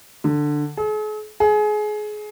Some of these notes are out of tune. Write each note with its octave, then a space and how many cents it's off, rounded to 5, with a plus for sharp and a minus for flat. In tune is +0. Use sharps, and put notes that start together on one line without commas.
D3 +10
G#4 +45
G#4 +25